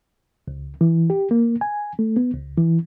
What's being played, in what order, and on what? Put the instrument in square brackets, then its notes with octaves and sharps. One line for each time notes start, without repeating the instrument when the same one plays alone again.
[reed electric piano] C#2
E3
G4
A#3
G#5
A3
B3
C#2
E3